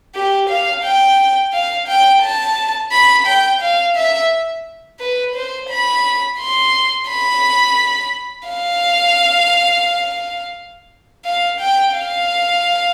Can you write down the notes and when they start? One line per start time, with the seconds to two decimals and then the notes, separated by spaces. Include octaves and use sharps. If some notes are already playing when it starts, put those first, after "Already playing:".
0.15 G4
0.50 F5
0.84 G5
1.54 F5
1.88 G5
2.23 A5
2.92 B5
3.27 G5
3.62 F5
3.96 E5
5.00 B4
5.35 C5
5.70 B5
6.40 C6
7.09 B5
8.49 F5
11.25 F5
11.60 G5
11.95 F5